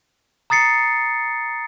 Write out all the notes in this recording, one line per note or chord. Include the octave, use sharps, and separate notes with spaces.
A#5 D#6 A6 C7 C#7